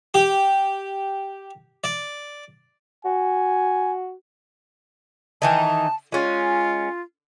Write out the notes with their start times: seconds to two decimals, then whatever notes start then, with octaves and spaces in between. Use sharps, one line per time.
0.14 G4
1.84 D5
3.05 F#4 G#5
5.42 D#3 E3 D#4 A5
6.12 G#3 C#4 F4